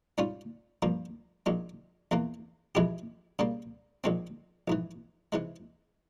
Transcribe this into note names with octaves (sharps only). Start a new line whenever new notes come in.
G#2 G3 C#4 F4
G2 F3 A#3
A#1 A#2 G#3
E2 E3 A#3
F2 E3 G#3 E4 G4
C#3 G3 A#3
A#1 A#2 G#3 C4
A#1 G#2 E3
C3 E3 G#3